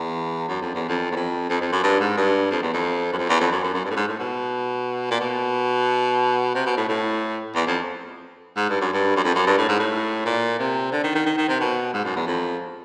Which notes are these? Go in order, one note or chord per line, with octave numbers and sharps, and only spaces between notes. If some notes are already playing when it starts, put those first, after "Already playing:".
Already playing: E2
F#2
F2
E2
F2
E2
F2
F2
F2
F#2
G2
G#2
G2
F2
E2
F2
F#2
F2
E2
F2
F#2
F#2
F#2
G2
A2
G#2
A2
B2
A#2
B2
C3
B2
A2
A2
E2
F2
G#2
G2
F#2
G2
F#2
F2
F#2
G2
A2
G#2
A2
A#2
C3
D3
D#3
D#3
D#3
D#3
C3
B2
G#2
F#2
E2
F2